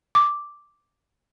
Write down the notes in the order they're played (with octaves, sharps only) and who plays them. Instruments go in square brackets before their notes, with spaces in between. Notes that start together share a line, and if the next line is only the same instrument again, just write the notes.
[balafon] D6